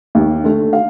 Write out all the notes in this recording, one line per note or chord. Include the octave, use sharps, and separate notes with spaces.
D#2
D3 A3
F5